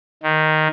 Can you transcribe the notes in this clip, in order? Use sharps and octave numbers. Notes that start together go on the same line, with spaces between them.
D#3